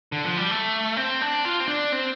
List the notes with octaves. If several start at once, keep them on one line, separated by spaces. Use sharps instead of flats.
D3
F3
G3
A3
C4
D4
F4
C4
D4
C4